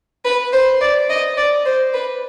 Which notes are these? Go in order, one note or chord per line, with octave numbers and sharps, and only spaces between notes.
B4
C5
D5
D#5
D5
C5
B4